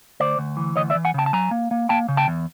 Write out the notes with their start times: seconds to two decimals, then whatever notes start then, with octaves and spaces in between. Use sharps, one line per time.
0.20 D2 C5 D5
0.38 D2
0.57 E3
0.76 D2 C#5 D#5
0.90 D5 E5
0.95 E3
1.05 F#5 G#5
1.14 C#3 G5 A5
1.26 A5
1.33 F#3 G#5 A#5
1.51 A#3
1.71 A#3
1.89 A#3 G5 A5
2.08 C#3
2.17 G5 A5
2.28 E2